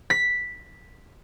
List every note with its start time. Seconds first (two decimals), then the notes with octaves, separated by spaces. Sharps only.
0.10 B6